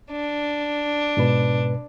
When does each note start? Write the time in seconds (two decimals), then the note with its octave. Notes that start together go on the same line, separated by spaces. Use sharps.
0.12 D4
1.17 G#2 B2 B4